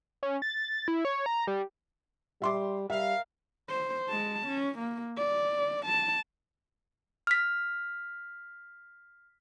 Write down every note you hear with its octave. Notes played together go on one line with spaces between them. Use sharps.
C#4
A6
E4
C#5
A#5
G3
G3 E5 C6 D6
G3 A#4 E5 F5
C5
G#3 A5
C#4
A#3
D5
A5
F6 B6